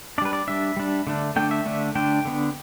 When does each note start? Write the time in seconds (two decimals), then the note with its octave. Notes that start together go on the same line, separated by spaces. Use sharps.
0.18 D4 D5
0.22 G3 B4
0.33 D5
0.48 G3 D4 E5
0.77 G3 D4
1.07 D3 A3 D4
1.36 D3 A3 D4 G5
1.51 E5
1.66 D3 A3 D4
1.95 D3 A3 D4 G5
2.25 D3 B3 D4